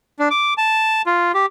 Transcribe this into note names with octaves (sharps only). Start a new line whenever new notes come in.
D4
D6
A5
F4
G4